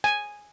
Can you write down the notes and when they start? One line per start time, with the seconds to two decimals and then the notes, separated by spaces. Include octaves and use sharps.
0.04 G#5